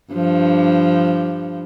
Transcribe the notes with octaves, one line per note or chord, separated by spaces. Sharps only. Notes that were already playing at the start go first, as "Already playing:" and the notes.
G2 F3